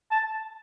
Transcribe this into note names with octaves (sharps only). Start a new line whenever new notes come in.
A5